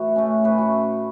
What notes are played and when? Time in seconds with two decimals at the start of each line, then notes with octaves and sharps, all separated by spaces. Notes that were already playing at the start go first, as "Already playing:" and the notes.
Already playing: A2 E3 F#4
0.16 C#3 A3 C#4
0.44 A2 A3 C#4 B4
0.58 F#4